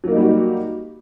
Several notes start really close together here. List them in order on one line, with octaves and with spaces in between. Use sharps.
F#3 A#3 D#4 G3 F#4